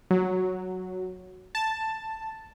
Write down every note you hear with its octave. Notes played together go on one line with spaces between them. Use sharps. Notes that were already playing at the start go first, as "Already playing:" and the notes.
F#3
A5